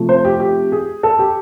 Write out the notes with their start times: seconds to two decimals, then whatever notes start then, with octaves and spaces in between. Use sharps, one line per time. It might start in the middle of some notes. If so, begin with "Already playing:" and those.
Already playing: C3 F3 A3
0.09 C5
0.25 G4
0.40 G4
0.72 G#4
1.03 A4
1.19 G4